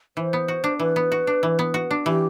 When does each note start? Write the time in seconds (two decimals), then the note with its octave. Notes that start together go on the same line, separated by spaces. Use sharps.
0.17 E3 C5
0.33 B3
0.48 F#4
0.64 D4
0.80 E3 B4
0.96 B3
1.12 F#4
1.27 D4
1.43 E3
1.59 B3
1.74 F#4
1.91 D4
2.06 E3 G4